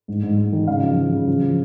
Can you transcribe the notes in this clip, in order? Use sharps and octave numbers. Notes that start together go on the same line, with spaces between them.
G#2
G#2
G#2
D#3
C#3 F5
F3
F3
C#3
F3
F3